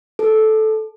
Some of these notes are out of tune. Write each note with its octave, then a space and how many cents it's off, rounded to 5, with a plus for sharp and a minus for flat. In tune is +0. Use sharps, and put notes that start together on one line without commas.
A4 -10